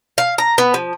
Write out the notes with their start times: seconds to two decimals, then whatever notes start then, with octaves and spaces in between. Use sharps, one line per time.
0.18 F5
0.38 A#5
0.58 B3
0.74 F3